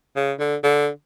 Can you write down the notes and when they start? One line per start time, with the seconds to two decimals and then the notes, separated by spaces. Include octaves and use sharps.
0.16 C#3
0.39 D3
0.63 D3